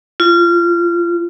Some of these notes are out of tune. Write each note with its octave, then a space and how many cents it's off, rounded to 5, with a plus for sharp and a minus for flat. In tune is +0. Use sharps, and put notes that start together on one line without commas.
F4 -25